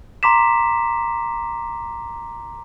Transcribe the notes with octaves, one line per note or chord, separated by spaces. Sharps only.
A#5 C6 D6 B6 E7